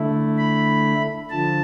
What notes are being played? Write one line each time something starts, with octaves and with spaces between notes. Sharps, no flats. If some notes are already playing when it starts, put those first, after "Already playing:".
Already playing: D3 A3 E4
B5
D3 F3 A5